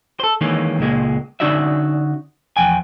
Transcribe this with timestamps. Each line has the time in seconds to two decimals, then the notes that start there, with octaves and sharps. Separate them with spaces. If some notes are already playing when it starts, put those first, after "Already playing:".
0.20 A4 C5
0.41 D#3 E3 G#3 A#3 C#4
0.79 C#2 A#2 G#3 A#3
1.40 D3 C#4 D#4 F#4 D5 E5
2.57 E2 F3 G5 G#5